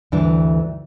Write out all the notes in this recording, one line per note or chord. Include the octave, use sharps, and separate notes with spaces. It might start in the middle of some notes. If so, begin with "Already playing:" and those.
D2 G2 E3 D4